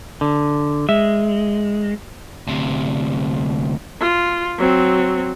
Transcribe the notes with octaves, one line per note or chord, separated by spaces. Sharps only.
D3
G#3 E5
D2 C3
F4
F#3 C4